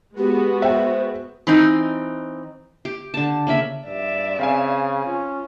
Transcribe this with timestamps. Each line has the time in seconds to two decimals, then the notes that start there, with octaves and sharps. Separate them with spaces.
0.17 G#3 B3 F#4 G4
0.62 C5 E5 G5
1.47 E3 C4 D#4
2.85 G4
3.14 D3 A5
3.47 C#3 A#3 E5 B5
3.86 G2 D5 E5
4.39 C#3 C4 F5 G#5
5.05 C#4 F4